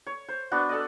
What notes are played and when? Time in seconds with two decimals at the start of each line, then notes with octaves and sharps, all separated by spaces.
0.07 C#5
0.29 C5
0.51 B3 D4 F#4
0.69 A4 D5 D#5